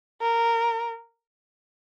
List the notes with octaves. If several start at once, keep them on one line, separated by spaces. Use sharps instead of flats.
A#4